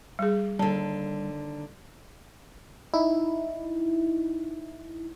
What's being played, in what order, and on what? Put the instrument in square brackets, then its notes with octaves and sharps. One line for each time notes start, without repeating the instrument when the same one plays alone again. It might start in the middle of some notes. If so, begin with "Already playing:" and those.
[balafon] G3 G#4
[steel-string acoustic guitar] D#2 D3 [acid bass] G3 [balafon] A5
[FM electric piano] D#4 E4